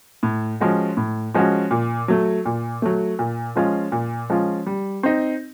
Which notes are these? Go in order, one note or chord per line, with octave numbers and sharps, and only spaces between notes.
A2
F3 G#3 C#4 F#4
A2
F3 G#3 C#4 F#4
A#2
F#3 A3
A#2
F#3 A3
A#2
F3 G#3 C#4 F4
A#2
F3 G#3 C#4 F4
G3
C4 D#4